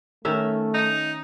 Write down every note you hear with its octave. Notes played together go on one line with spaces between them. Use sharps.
D#3 A3 C#4 E5
D#4